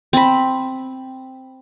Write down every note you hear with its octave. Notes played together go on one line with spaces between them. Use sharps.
C4 B5